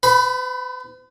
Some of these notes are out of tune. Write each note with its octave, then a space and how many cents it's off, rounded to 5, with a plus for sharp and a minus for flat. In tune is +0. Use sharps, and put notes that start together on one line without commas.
B4 +45 B5 +0